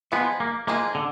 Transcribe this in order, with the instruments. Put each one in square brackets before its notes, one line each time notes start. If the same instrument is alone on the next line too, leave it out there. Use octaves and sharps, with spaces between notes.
[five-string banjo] F3 G#3 D#4 G#4 [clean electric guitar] B3
[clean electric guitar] A#3
[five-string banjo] F3 G#3 D#4 G#4 [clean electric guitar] A#3
[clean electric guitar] D3